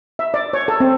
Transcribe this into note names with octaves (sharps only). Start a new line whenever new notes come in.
E5
D5
C#5
A4
C4